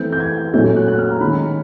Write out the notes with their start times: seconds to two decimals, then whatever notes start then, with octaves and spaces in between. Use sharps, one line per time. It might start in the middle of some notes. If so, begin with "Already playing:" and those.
Already playing: E3 A3 C4 G6
0.12 G6
0.20 G#6
0.54 A#2 F#3 A3 C#4 G6
0.76 F#6
0.88 F#6
0.99 F6
1.10 A#5
1.21 D#3 G#3 C#4 B5